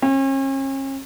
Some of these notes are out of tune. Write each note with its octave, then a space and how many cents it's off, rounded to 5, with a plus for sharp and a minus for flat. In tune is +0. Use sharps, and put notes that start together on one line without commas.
C#4 -40